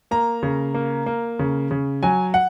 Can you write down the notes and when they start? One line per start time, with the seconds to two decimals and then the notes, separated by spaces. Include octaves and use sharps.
0.11 A#3 A#5
0.43 C#3
0.74 A#3
1.06 A#3
1.39 C#3
1.71 C#3
2.03 F#3 G#5
2.34 F#5